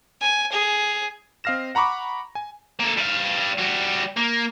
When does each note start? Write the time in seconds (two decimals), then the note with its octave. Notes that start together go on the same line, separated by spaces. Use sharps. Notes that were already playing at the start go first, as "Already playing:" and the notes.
0.21 G#5
0.52 G#4
1.44 C4 D#5 F5 F6 A#6 E7
1.75 F#5 A#5 B5 C#6 D6
2.35 G#5
2.80 A#3 A4
2.97 G3 F5
3.58 G3 F#4
4.17 A#3